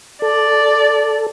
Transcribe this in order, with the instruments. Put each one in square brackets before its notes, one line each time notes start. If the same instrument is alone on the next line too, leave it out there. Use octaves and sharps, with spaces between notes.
[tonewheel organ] A4 [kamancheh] D5